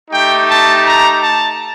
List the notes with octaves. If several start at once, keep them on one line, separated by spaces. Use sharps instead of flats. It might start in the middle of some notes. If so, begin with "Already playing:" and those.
A3 D#4 G4 G5
A5
A#5
A5